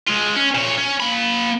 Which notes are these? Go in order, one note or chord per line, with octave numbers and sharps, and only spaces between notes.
G#3 F4
C#4
A#2 C#5
C#4
A#3 B5